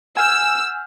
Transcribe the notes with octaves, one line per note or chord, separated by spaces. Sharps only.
F#5 G#5 E6 F6 G6